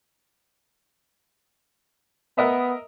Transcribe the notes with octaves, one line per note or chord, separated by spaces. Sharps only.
B3 A#4 D#5 E5